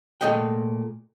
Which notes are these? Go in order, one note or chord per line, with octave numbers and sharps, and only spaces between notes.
A#2 A3 G#4 D#5 F#5 G5